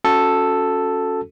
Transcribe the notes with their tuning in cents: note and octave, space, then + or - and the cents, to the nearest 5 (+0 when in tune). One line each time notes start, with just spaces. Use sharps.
C#4 +0 F#4 -20 A4 +0